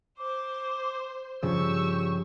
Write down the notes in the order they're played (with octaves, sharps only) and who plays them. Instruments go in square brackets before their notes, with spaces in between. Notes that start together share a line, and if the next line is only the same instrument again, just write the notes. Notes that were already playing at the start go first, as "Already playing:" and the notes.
[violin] C5 [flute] D6
[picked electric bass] G2 C#3 F3 [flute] G4 [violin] C#6 E6